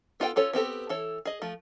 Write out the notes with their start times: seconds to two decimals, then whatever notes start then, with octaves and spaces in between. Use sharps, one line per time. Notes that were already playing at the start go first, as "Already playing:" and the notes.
0.20 B3 F4 A4 F#5 G5
0.36 C#4 F4 A4 C#5
0.53 B3 C4 G4 A4
0.89 E3 A4 C#5
1.25 G#4 D#5
1.42 F3 A3